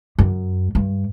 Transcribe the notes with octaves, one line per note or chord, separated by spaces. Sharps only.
F#2
G2